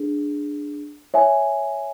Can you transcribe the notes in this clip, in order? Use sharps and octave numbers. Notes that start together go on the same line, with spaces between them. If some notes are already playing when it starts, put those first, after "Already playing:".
Already playing: D4 G#4
C#5 E5 G#5